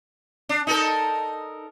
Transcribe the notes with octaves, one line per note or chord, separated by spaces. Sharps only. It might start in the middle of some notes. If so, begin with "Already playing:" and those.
D4
D#4 A4 A#4